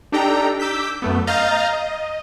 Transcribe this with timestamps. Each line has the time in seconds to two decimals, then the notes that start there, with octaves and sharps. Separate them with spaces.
0.12 D4 D#4 G4 A4 G5 A#5
0.60 D6 E6 G6 B6
1.02 F#2 A3 B3
1.27 D#5 F5 A#5 F6 G6 A6
1.73 D#5